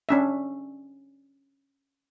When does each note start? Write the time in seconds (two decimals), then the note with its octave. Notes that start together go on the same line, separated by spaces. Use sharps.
0.09 C#4 D4 E5